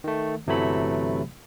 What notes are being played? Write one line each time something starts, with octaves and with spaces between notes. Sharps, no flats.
D#3 A3
G1 C3 E3 F#3 A3 B5